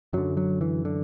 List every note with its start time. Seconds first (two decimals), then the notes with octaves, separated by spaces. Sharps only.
0.13 F#2 D3 F#3
0.37 F#3
0.61 E3
0.85 D3